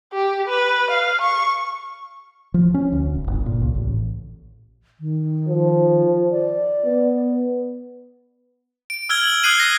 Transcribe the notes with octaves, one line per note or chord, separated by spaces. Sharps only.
G4
B4
F5
C#6
F3
C#4
D2
D1
G1
A#2
C#2
A1
D#3
F3
D5
B3
D7
E6 F6 G#6 G7
F#7
D#6 F#6 G#6 C7 D#7 F#7
G#6 A#6 C7